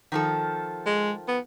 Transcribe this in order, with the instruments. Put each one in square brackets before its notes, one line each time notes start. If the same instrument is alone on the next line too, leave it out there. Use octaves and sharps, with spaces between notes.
[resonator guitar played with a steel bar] D#3 F3 A4
[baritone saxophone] G#3
B3